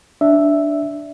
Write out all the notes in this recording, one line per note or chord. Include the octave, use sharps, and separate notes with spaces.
D4 E5